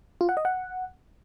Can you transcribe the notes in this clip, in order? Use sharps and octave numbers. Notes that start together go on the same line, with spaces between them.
F4
F#5
D#5
F#5